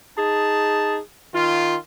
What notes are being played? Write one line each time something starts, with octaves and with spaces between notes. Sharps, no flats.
D#4 G#4 A5
D#3 F4